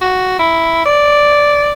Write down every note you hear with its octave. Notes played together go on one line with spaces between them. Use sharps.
F#4
E4
D5